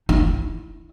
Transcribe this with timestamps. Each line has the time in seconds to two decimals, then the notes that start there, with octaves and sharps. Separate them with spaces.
0.09 D#4 E4